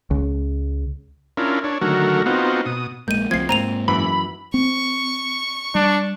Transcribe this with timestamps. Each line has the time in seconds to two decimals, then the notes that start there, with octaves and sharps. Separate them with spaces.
0.11 C#2
1.37 C#4 D4 E4 F4 A#4
1.64 D4 C#5
1.81 D3 D#3 F#3 A3 F#4 A#4
2.26 B3 C4 D#4 F4 F#4
2.66 B2 D#6
3.08 A#1 G#3 A#3 G6 D#7
3.31 C#2 F3 A3 C4 G#6 C7
3.49 G#2 A#3 C4 A#5 D#7 F7
3.88 F#2 E3 B5
4.54 C4 C#6
5.75 G3 D4